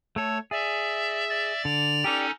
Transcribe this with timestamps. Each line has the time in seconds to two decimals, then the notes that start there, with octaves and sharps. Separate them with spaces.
0.16 A3 A4 C#5
0.51 G#4 D5 E5
1.30 D5 A6
1.65 D3 F7
2.04 C#4 D#4 G4 A4 D5